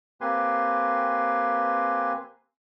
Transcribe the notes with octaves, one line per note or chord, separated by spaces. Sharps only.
A#3 C4 G4 B4 G#5 C6